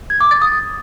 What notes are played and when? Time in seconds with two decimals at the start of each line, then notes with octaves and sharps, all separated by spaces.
0.10 G#6
0.21 D6
0.31 A6
0.42 D#6